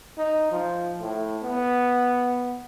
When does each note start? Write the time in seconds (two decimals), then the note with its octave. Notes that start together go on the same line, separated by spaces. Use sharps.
0.18 D#4
0.51 F3
1.00 A2
1.42 B3